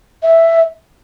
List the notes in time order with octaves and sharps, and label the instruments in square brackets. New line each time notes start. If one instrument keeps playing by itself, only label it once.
[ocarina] E5